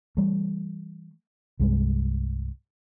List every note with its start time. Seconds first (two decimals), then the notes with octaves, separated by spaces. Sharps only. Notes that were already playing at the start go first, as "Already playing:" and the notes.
0.17 E3 G3 A3
1.59 C2 G2 G#3